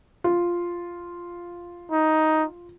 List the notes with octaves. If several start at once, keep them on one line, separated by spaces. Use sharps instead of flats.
F4
D#4